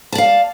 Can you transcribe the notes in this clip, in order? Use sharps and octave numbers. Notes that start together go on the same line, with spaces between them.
D5 F5 A5